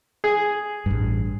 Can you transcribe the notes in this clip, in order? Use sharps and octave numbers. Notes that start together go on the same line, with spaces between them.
G#4
A1 G2